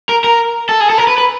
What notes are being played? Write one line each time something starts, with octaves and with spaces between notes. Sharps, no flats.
A#4
A#4
A4
G#4
A4
A#4
B4
B4